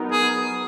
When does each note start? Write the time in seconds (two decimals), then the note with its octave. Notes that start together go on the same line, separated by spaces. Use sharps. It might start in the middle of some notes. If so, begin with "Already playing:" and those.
Already playing: F#3 B3 D#4 A#4
0.12 G#4